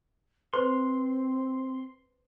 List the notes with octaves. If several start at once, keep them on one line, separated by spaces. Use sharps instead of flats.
C4 B4 C5 C6